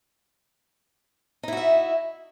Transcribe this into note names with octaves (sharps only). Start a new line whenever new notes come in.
D#4 E4 F#4 E5